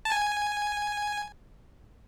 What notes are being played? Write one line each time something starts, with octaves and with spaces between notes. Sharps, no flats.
A5
G#5